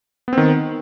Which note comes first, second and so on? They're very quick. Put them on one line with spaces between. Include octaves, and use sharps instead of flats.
B3 C4 D#3